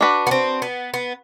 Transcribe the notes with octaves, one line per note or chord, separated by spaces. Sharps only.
D4 F#4 B4
B3
C4
B3
B3